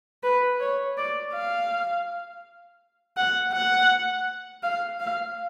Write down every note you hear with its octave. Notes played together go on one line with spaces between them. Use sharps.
B4
C#5
D5
F5
F#5
F#5
F5
F5